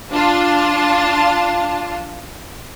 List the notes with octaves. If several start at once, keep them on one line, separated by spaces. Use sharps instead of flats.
D4 F4 A5